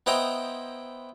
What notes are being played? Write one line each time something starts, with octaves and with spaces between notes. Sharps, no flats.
B3 E4 C5 D#5 G5 A#5